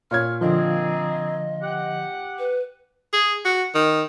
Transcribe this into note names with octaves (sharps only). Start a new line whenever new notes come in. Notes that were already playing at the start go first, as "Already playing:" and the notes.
A#2 C#5 F6 G#6
D3 F3 A#3 C4 G#4 D#5
G4 F#5
B4
G#4
F#4
D#3